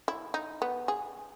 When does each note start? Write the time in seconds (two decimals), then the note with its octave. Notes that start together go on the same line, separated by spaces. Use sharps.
0.08 E4
0.34 D#4
0.62 B3
0.88 G#4